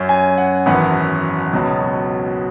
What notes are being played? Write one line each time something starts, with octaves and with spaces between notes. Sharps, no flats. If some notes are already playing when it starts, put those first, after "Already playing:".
Already playing: F#2 F#3 C#4
G#5
F#5
G#1 F#2 E3 B3 F#5
C#2 B2 F#3 B3